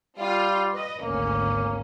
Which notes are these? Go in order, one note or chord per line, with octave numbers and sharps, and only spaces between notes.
G3 F4
B4 D#5
G#1 D2 A#3 C#4